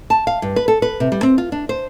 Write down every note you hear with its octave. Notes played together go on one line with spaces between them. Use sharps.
A5
F5
G2
B4
A4
B4
C3
G3
C4
F4
D4
C5